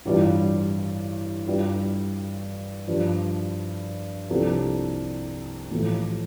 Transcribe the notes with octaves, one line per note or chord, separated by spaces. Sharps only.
A1 G2 G3 F4 D5
G2 G3 F4 D5
G2 F3 D4
C2 C3 F3 D4 A4
A1 A2 F3 A3 F4